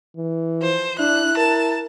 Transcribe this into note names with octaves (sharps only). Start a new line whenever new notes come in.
E3
F3 C5
D4 E4 F#6
A#4 A5